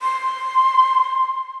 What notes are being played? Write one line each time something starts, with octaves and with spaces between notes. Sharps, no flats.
C6